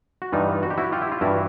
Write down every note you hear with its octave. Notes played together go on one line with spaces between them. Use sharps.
F#4
G2 E3 G3 D#4 F4
F#4
G4
E4 F#4
F4 G4
E4
F4
G2 E3 G3 E4 F#4